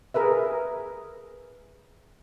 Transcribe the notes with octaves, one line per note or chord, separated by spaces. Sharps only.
G#4 A#4 B4 E5